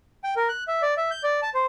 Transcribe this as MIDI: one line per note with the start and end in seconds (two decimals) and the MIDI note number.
0.24 0.34 79
0.36 0.48 70
0.49 0.64 90
0.68 0.82 76
0.82 0.94 74
0.97 1.11 76
1.11 1.23 91
1.23 1.40 74
1.42 1.50 81
1.54 1.66 72